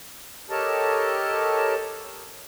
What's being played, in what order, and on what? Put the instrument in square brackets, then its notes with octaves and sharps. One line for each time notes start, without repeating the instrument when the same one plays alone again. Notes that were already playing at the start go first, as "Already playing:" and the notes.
[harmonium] G4 A4 A#4 C#5 D#5 A5